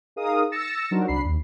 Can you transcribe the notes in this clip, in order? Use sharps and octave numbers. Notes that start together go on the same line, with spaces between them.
D#4 G#4 A#4 F5 D#6
E6 A6 A#6 C#7 E7
F#3 D4 D#4 F#4 A#4 C5
C2 D4 B5 C7
D#2